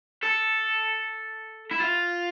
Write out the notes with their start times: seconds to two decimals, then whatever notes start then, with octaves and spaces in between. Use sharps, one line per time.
0.23 A4
1.71 E4
1.80 F4